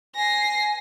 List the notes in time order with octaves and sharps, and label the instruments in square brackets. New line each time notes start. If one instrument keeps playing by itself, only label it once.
[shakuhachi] G#5 [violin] A#6 C7